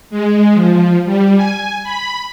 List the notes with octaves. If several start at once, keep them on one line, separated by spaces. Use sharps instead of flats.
G#3
F3
G3
G#5
B5